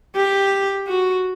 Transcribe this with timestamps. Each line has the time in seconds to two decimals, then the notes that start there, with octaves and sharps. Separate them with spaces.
0.16 G4
0.88 F#4